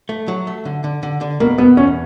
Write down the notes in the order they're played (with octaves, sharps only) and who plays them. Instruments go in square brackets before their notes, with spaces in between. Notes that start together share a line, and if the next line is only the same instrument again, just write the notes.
[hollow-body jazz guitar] A3
F#3
A3
D3
D3
D3
D3
[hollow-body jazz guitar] B2 [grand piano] A#3
[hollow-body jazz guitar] B2 [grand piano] B3
[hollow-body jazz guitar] E2 [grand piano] C#4